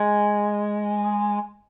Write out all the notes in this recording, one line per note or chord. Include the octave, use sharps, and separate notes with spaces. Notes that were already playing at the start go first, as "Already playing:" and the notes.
Already playing: G#3